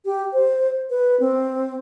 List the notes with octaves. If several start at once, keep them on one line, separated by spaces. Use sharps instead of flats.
G4
C5
B4
C4